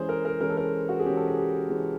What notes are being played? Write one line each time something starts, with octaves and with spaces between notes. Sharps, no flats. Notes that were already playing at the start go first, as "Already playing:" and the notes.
Already playing: E3 G#3 C#4 G#4 C5
A#4
A#4
E3 G#3 C#4 A#4
A4
A#4
F#4
G#4
E3 G#3 C#4 G4
A4
G#4
G4
E3 G#3 C#4